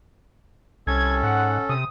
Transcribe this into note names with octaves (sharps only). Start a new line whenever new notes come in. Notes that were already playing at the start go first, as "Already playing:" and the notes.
C2 C#4 A4 G#6
G#2 F#5
C3 D#6